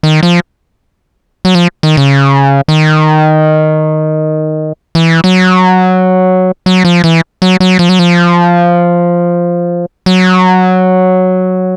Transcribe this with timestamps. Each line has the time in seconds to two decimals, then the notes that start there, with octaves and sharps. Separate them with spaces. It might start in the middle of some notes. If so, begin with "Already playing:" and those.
0.03 D#3
0.23 F3
1.45 F#3
1.55 F3
1.83 D#3
1.97 C#3
2.68 D#3
4.95 E3
5.24 F#3
6.66 F#3
6.85 F3
7.04 E3
7.42 F#3
7.60 F#3
7.79 F3
7.89 F#3
7.99 F3
10.06 F#3